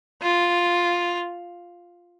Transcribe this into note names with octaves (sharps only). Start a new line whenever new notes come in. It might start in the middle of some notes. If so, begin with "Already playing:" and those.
F4